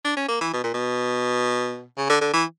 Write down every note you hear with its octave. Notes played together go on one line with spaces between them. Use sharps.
D4
C#4
A#3
E3
B2
A#2
B2
C#3
D3
D3
E3